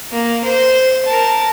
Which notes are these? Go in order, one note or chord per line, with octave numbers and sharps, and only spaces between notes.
A#3
C5
A#4 A5